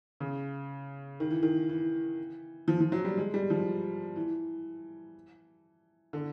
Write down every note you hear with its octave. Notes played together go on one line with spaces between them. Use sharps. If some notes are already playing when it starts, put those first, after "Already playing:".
C#3
D#3
E3
D#3
E3
F3
F3
F#3
G3
G#3
G3
F3
E3
D3